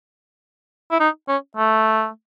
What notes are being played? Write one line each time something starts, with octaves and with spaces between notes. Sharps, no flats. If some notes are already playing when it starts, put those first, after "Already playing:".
E4
D#4
C#4
A3